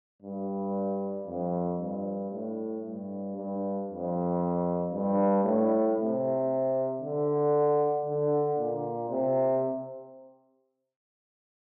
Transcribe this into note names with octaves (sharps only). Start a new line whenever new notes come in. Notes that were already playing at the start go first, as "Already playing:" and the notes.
G2
F2
G2
A2
G2
G2
F2
G2
A2
C3
D3
D3
A#2
C3